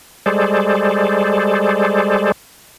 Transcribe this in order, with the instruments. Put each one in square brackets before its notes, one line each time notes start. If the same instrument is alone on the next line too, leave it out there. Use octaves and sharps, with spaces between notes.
[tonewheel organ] G3 G#3 G#4 A4 C5 D5